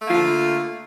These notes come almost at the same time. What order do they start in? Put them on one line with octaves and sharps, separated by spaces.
A3 A#3 F4 D3